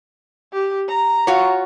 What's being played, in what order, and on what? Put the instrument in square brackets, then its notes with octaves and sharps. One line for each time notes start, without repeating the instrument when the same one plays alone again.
[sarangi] G4
A#5
[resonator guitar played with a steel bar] F4 F#4 C#5